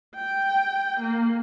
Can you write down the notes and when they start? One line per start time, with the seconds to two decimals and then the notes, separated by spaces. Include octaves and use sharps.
0.15 G5
1.00 A#3